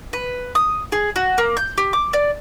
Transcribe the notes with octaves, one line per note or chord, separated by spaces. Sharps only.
B4
D#6
G#4
F#4
A#3
G6
G4
D6
D5